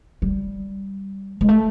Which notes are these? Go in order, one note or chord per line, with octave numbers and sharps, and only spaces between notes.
G3
G#3
A3